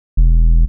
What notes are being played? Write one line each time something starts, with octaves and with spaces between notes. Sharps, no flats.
E1